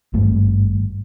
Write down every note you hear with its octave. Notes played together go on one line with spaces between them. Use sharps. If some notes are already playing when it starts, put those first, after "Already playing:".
G#1 G2 A3